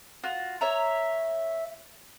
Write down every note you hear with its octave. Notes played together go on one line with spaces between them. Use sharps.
F4 F#4
C#5 E5 A#5